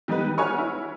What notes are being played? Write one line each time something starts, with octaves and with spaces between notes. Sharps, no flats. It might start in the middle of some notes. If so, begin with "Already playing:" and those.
D#3 G3 B3 D#4 B4
F#4 B4 C#5 G#5 C#6 F6
E4